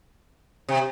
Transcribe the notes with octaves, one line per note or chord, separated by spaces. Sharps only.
C3